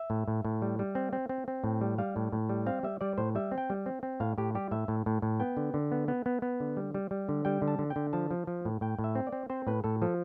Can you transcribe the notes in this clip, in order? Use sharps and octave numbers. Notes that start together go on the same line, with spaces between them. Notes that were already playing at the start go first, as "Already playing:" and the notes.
Already playing: E5
A2
A2
A2
G3
G3
C4
C4
C4
C4
A2
G3
G3 F5
A2
A2
G3
C4 F5
G3 E5
G3 D5
A2 C5
G3 E5
C4
G5
G3
C4
C4
A2 F5
A2 G4
G3 G4
A2 E5
A2
A2
A2
B3 G5
D3
D3
B3
B3
B3
B3
D3
G3
G3
G3
D3
G3 G5
D3
A5
D3
G5
D3
F3 A5
F3
F3
A2
A2 G5
A2
E5
C4
D5
C4
C4 C5
A2 B4
A2 A4
F3 A4